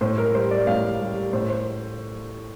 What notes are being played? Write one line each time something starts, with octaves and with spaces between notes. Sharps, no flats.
A2 C5
A#4
G3 C5
D5
A2 F5
G3
A2 C5
C5